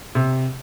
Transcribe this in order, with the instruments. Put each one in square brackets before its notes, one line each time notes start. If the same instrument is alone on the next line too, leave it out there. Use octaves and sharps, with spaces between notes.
[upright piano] C3